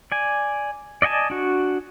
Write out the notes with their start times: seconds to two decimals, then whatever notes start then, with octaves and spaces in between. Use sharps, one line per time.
0.12 D5 G#5
1.02 D5 D#5 F#5 G#5 A5
1.30 D4 F#4